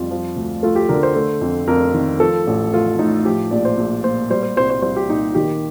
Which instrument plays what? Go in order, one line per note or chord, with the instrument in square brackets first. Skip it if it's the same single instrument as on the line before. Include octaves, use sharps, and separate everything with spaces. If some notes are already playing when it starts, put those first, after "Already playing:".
Already playing: [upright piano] F2 G3 F4
F3
D2
A3 F4
G4
D3 A#4
C5
A3
F2
F2 A#4
D#3
F3 A4
A1
A3 F4
A2 D#4
F3 G4
A#1 D5
C5
A#1
A#2 C5
G3 C5
C5
C2 C5
C5
C2 C5
G4
A#2 D#4
D#3 G4